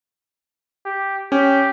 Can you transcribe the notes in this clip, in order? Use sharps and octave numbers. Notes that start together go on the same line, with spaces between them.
G4
C#4 G4